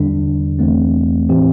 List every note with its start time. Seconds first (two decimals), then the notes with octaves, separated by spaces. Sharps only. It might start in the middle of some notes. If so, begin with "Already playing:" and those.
Already playing: E2 D3 G3 D4
0.59 E2 E3 A3 C4
1.29 A2 E3 C4 G4